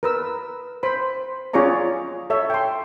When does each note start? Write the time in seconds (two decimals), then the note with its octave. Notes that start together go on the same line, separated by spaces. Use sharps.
0.03 A#4 B4 E6
0.83 C5 B5
1.53 C#4 F4 G#4 C#5 D5 A#5
2.30 A4 C#5 E5
2.50 G5 C6